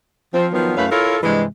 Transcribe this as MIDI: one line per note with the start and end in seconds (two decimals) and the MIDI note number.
0.34 0.47 53
0.34 0.47 60
0.52 0.76 51
0.52 0.76 53
0.52 0.76 54
0.52 0.76 59
0.77 0.86 42
0.77 0.86 57
0.77 0.86 61
0.77 0.86 64
0.77 0.86 71
0.77 0.86 77
0.91 1.17 64
0.91 1.17 65
0.91 1.17 69
0.91 1.17 70
0.91 1.17 73
0.91 1.17 77
1.23 1.44 43
1.23 1.44 48
1.23 1.44 52
1.23 1.44 56